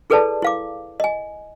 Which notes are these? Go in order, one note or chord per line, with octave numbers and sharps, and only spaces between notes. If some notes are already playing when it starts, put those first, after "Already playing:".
E4 G#4 A4 B4 D5 A5
E4 F5 D6
D#5 G#5